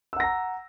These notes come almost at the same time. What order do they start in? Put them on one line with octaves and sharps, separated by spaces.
E6 F#5 A#6 A#5